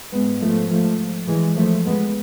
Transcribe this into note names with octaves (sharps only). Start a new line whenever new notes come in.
G#2 G#3 B3
F3 A3
F3 A3
E3 G#3
F3 A3
G#3 B3